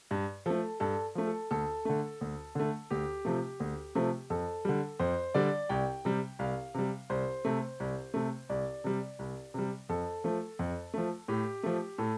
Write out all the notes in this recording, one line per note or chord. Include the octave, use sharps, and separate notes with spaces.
G2
F3 A3 A4
G2 A4
F3 A3
A4
D2 A4
D3 A3
D2
D3 A3
D2 G4
C3 F3 A3
D2
C3 F3 A3
F2 A4
D3 G3
F2 C5
D3 G3 D5
C2 G5
C3 G3
C2 F5
C3 G3
C2 C5
C3 A3
C2
C3 A3
C2 D5
C3 G3
C2
C3 G3
F2 A4
F3 A3
F2
F3 A3
A2 G4
F3 A3
A2 A4